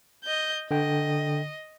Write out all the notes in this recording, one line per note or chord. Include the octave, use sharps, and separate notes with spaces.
D#5 G6
D3 D#5 G5